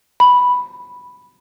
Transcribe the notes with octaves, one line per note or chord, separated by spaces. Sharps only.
B5